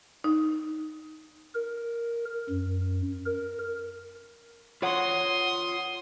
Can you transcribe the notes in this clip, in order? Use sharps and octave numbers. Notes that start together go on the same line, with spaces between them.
D#4
A#4
F#2
A#4
F4 C#5 F#5 C6 D#6